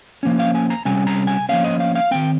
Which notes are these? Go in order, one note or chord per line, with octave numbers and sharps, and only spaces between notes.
F3 A#3 C#4
F5
G#5
A#5
C3 G3 C#4 G#5
A#5
G#5
F3 A#3 C#4 F5
D#5
F5
F5
D#3 G#3 C4 G5